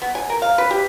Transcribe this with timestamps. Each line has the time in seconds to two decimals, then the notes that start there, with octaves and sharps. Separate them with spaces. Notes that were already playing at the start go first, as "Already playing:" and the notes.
0.02 B3
0.15 G#5
0.30 A#4
0.42 F5
0.58 B4
0.71 G4